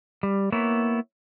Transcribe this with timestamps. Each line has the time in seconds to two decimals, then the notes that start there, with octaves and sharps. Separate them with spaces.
0.23 G3
0.52 A#3 B3 E4 C#5